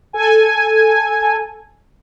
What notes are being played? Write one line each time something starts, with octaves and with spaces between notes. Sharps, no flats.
A4 G#5